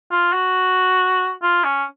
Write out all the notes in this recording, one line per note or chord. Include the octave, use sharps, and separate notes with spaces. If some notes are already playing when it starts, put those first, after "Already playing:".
F4
F#4
F4
C#4